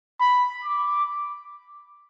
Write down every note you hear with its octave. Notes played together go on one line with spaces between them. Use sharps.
B5
D6